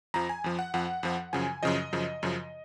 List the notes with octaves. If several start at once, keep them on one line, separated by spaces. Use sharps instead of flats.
F2 F3 A#5
G#5
F2 F3
F#5
F2 F3 F#5
F2 F3
F#2 C#3 F3 G#5
F#2 C#3 F3 D#5
F#2 C#3 F3
F#2 C#3 F3